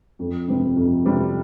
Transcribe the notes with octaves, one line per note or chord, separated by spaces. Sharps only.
F2
C3 G3 C4
F2
C3 G3 C4